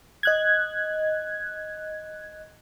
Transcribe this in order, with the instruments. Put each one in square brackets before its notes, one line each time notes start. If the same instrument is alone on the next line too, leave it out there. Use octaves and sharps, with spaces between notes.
[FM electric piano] D#5 F#6 G#6